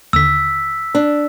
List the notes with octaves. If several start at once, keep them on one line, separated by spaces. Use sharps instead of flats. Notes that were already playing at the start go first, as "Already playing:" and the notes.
D#2 D3 E6 B6
D4